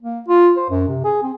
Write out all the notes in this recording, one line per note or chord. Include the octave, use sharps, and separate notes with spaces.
A#3
F4
C5
F#2
C3
G#4
C4